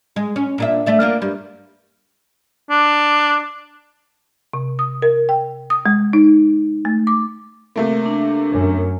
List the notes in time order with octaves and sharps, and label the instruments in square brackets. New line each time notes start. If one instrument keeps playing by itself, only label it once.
[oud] G#3
C#4
A#2 D4 E5
A3 D5 E5
A#3 D4 F4
G2 G3
[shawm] D4
[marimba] C3
D#6
A#4
G5
D#6
G#3
D#4
A3
D6
[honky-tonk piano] C3 A3 A#3
[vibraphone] D4
[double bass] F#2